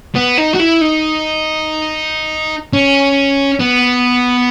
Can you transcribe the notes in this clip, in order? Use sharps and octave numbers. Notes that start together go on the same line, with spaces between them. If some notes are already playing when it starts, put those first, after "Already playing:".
B3
D#4
F#4
E4
D#4
C#4
B3